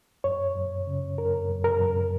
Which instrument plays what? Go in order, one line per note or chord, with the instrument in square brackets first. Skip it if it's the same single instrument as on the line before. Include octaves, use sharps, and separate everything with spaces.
[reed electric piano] F#2 C#5
F#2
C#3
F#2 A#4
F#2
A#4
F#2